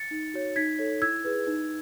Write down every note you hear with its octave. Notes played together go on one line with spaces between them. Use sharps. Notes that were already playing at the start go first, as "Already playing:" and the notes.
Already playing: A6 C#7
D#4
F#4 C#5
D#4 G#6 B6
A4 C#5
E4 E6 G#6
G#4 B4
D#4